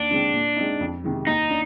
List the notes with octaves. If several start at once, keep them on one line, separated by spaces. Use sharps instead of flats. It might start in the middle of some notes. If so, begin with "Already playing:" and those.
Already playing: D#2 D4
D3 G#3 C4
A#2
G#3 C4 D#4
F2
C3 D#3 G#3
D#2 D#4
D4